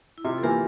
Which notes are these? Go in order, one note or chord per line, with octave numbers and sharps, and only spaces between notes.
E4
C3 F4
A4
E3 A#3 G4